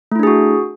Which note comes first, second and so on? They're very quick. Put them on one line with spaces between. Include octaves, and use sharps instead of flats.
A3 E4 D4 G#4 F#4